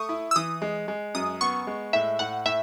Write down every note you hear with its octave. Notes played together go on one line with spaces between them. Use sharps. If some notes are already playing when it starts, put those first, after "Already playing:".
Already playing: A3 C#6 D#6
E4
E6
E3 D#6
G#3
G#3
F#2 D#6
B3 C#6
G#3
A2 E5
A2 F#5
A2 E5